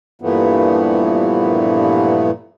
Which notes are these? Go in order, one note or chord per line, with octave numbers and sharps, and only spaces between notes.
G2 A#2 E3 F3 A3 B3